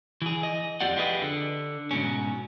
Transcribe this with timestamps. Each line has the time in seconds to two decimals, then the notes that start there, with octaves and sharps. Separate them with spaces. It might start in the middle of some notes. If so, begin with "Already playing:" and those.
0.22 E3 G#4
0.43 D#5
0.81 F2 F4 G4 D5 F#5
0.97 F4 G4 G#4 B4 C5 D#5
1.22 D3
1.91 G#2 B2 C#4